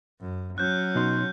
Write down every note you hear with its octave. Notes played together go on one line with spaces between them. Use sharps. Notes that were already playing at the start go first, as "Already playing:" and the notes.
F#2
F#3 C#4 F#6 G6
B2 D#4 C6